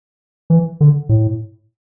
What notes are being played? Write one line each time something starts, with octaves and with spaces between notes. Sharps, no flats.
E3
D3
A2